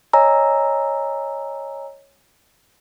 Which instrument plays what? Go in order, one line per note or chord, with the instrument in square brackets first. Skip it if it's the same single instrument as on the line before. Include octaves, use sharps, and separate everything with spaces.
[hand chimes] C#5 D#5 G#5 A#5 E6